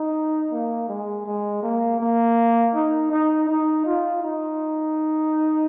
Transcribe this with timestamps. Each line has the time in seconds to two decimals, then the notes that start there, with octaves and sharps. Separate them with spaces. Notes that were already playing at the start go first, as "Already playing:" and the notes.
Already playing: D#4
0.53 A#3
0.89 G#3
1.26 G#3
1.63 A#3
2.00 A#3
2.75 D#4
3.12 D#4
3.49 D#4
3.86 F4
4.23 D#4